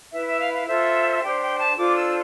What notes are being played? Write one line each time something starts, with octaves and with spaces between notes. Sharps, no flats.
E4 B4 E5
E5
F5
F5
F4 A4 C5 E5
D4 G4 C5 G5
G5
A5
D4 F4 A4 C5 D6
E6